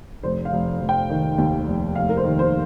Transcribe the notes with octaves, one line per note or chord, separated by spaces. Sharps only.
F1 C5
F5
F1
F1
G5
D#3
D#2
F1
F1 F5
A#4
C5
D#3
C5